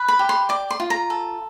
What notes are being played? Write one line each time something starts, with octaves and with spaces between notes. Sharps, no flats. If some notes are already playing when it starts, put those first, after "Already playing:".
Already playing: B4
B5
G4
C6
D5 D6
C6
F4
A#5
A4